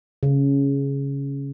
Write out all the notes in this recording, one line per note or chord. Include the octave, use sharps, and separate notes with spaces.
C#3